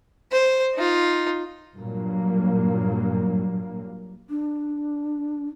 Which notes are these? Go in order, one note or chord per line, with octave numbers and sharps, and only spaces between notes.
C5
D#4 F4
G2 A#2 F#3 A#3
D4